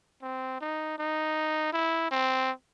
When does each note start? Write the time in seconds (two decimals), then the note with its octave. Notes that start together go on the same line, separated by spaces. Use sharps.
0.22 C4
0.61 D#4
0.99 D#4
1.73 E4
2.11 C4